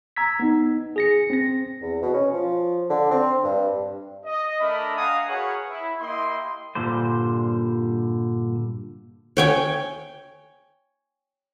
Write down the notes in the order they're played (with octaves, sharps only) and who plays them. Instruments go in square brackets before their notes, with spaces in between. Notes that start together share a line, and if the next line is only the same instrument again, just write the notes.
[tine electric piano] A#5 E6 G#6 B6
B3 D#4
G#4 A#6 C#7
C4 A#6
[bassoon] E2
B2
C#4
F3
D3
C4
G2
[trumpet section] D#5
A3 D4 A#4 D#5 E5 B5
D#5 F5 F#5 G#5 A#5 D#6
F#4 G#4 A#4 B4 C#5 F#5
E4
A#3 E4 G4 D#5 C6
[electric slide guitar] G2 A#2 D3 G3 C5
[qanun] C#5 G5 G#5